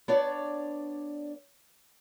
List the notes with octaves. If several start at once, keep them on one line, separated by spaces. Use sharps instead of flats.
B3 D4 C#5 D5